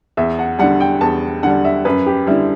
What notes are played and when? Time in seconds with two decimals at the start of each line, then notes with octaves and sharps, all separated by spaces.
0.17 E2 E5
0.39 F#5
0.59 D3 G3 F#5
0.80 G5
1.01 E2 A5
1.43 D3 G3 F#5
1.65 E5
1.85 F#2 B4
2.06 G4
2.27 D3 G3 E4